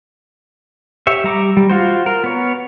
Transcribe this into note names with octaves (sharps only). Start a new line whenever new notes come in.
G4 C#5 E5
G3 A#5 D6
G3
F4 F#4 C5
A#4
B3 C#5